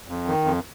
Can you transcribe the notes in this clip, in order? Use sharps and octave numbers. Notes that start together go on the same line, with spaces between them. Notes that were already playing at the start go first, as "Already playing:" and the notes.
F2
D#3
F2